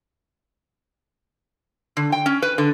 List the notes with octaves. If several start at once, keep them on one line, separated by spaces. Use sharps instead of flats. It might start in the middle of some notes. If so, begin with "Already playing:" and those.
D3
G5
C#4
B4
D3